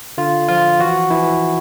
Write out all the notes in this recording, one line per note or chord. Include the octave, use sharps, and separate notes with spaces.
D3 F4
F3 F4
E3 F#4
E3 E4